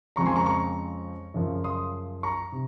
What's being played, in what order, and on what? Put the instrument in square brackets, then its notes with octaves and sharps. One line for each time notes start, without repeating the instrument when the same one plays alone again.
[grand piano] F2 C#3 F3 G#3 C4 A#5 C#6
G#5 C6
A#5 C#6
A#5 C#6
F#2 C#3 F3
C6 D#6
A#5 C#6
C3